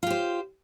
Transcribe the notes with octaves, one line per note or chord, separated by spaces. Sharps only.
F4 G4 C5